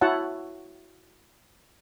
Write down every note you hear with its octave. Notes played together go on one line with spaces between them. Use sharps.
E4 F#4 C#5 F#5 A5